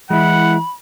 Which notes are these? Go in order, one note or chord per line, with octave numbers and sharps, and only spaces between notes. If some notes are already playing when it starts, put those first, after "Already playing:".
E3 G#3 E4 F#5 B5